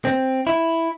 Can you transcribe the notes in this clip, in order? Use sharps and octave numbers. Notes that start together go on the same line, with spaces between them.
C4
E4